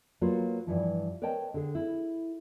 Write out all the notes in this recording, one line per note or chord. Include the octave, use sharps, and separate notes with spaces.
F#3 A#3 F4 F#4 B4
G2 E3 F3
A#4 B4 C#5 D#5 G5 A5
D3 G#4
E4